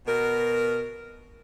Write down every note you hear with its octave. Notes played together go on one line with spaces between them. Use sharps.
B2 A#4